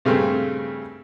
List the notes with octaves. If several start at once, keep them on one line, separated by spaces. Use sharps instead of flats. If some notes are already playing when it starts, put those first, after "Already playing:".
G2 C#3 A3 C4